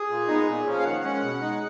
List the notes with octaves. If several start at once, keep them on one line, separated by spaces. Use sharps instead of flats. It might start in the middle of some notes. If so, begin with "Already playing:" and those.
Already playing: G#4
A#2
G#3 B3 D#4
A#2
F3 A#3 C#4
F5
D#3 F#5
G#3 C#4
B2
G#3 D#4